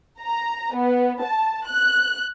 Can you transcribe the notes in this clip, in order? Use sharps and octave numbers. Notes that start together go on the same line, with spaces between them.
A#5
B3
A5
F#6